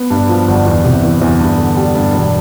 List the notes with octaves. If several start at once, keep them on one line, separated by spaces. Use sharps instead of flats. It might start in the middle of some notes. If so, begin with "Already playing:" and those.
Already playing: B3
G2
F3
G1
E2
C3
E3
E2
G2
D3
G3
G2
E1